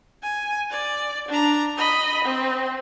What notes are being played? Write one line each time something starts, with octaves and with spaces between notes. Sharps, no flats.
G#5
D5
D4 A#5
D#5 B5
C4